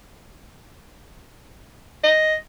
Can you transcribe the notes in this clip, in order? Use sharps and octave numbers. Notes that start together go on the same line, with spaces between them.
D#5